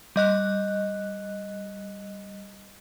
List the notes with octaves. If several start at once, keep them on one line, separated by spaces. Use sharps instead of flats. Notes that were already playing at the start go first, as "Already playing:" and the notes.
G3 D#5 F#6